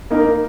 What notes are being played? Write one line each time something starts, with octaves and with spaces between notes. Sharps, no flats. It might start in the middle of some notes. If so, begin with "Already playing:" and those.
A#3 D#4 A#4